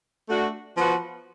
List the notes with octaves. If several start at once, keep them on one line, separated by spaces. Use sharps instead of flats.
A3 D4 F#4
F3 B3 F#4 B4